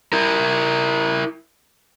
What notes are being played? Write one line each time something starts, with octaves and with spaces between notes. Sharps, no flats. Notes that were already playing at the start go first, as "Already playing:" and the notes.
E4 A#4